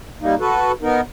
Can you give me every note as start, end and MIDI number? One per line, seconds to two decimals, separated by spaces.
0.22 0.35 55
0.22 0.35 58
0.22 0.35 63
0.40 0.72 66
0.40 0.72 69
0.40 0.72 71
0.82 1.01 59
0.82 1.01 63
0.82 1.01 70